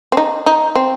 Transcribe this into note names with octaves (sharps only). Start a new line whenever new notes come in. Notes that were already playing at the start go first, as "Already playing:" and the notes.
C4
D#4
D#4
C4